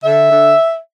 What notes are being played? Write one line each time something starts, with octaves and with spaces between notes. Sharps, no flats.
D3 E5
D3